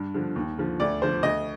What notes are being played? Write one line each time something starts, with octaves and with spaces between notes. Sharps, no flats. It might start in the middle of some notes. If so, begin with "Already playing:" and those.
Already playing: G2
D3 F3
D#2
D3 F3
D2 D5
D3 F3 C5
D2 D#5